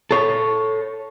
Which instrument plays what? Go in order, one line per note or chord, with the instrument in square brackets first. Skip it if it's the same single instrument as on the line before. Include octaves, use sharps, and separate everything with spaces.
[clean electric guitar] A4 C#5